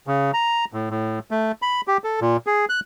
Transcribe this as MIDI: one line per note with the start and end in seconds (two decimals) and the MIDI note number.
0.07 0.31 49
0.34 0.65 82
0.73 0.90 45
0.90 1.19 45
1.31 1.52 57
1.62 1.81 83
1.87 1.97 67
2.04 2.20 69
2.21 2.37 46
2.47 2.65 68
2.69 2.80 90